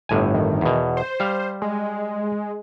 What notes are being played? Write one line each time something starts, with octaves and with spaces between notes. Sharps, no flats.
G1 A2 G#5
D#3
E2 B2
C5
G3 F5
G#3